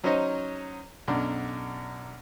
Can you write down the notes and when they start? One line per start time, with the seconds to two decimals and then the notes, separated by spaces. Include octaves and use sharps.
0.03 F#3 C#4 D#4 C5 C#5 D#5
1.08 B1 F#2 D4